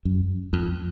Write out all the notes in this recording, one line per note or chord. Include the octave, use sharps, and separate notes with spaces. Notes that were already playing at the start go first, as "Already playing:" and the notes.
F#2
F2